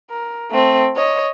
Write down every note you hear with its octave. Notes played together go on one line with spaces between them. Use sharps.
A#4
A3 C4
C#5 D#5